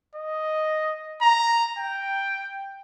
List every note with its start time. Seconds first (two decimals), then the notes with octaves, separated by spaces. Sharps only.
0.15 D#5
1.22 A#5
1.78 G5